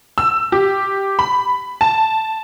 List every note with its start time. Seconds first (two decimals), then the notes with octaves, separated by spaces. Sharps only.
0.18 E6
0.52 G4
1.19 B5
1.81 A5